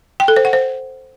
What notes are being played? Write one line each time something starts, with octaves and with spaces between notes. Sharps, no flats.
G5
A4
C5
F#5
C5